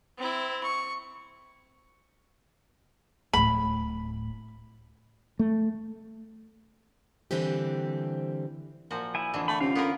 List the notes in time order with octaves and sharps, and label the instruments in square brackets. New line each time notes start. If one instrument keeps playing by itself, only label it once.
[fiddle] C4 E4
C#6
[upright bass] D1 A2 [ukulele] B5
[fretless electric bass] A3
[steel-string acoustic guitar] D3 E3 G3 C4 G4
[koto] A#2 F3 F#4
[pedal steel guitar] E4 G#5
[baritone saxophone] F2 [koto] D3 E3
[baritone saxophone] A3 [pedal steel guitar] B5
[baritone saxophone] C3 [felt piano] C#4 [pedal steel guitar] F4 F5
[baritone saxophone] D3 [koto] B3 A#4